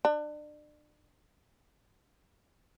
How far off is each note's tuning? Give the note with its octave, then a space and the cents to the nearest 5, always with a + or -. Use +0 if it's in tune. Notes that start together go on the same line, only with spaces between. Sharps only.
D4 +35